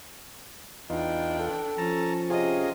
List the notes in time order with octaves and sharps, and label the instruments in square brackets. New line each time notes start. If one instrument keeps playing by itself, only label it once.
[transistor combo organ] E2 F4 [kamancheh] D4 G5 [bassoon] D#4
[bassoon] A4
[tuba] F3 [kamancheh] C#4 [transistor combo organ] A5 A#5
[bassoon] C3 [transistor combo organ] C#4 F4 G#4 [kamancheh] D#5